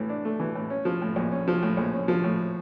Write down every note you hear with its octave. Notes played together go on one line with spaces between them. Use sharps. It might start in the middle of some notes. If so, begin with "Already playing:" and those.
Already playing: A2 E3 A3
D4
A3
E3
A2
C#4
F3
A2
A#1
C#4
F3
A2
A#1
C#4
F3
A2